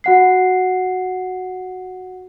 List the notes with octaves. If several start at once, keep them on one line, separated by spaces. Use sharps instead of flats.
F#4 F#5 C7